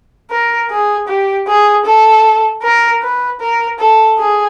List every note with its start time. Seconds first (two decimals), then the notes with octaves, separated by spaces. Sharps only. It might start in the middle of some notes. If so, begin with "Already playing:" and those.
0.31 A#4
0.70 G#4
1.08 G4
1.48 G#4
1.85 A4
2.63 A#4
3.02 B4
3.40 A#4
3.79 A4
4.18 G#4